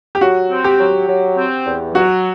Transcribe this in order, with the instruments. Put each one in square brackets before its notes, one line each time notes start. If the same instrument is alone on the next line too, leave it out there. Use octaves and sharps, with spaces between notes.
[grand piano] G4
[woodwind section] F#3 [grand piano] F#4
[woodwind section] C4
[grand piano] G4
[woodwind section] F#3
F#3
C4
E2
[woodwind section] F#3 [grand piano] F#4